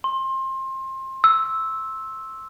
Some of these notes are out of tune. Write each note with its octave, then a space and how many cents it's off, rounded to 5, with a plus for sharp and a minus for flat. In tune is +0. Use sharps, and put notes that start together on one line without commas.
C6 +25
E6 -10